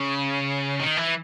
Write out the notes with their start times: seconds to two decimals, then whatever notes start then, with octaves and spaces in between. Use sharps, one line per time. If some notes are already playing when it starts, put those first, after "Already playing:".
Already playing: C#3
0.80 D#3
0.97 E3